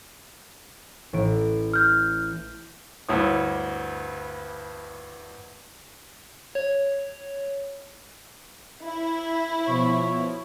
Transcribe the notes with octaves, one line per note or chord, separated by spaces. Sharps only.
A1 D7
F6 G6
D2 G2 E4 C#5 D#6
C#5
E4
B2 F3 C#5